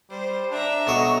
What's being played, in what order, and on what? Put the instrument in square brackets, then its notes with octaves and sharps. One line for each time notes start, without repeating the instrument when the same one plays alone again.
[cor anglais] G3 [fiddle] C5
[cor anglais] D4 [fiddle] E5 A#5
[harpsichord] B1 F#3 D#5 [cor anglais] F#4